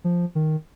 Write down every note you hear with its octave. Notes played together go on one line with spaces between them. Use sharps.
F3
D#3